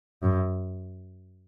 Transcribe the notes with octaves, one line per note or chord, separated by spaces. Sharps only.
F#2